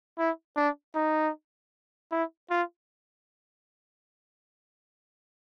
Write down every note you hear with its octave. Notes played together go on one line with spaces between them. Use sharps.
E4
D4
D#4
E4
F4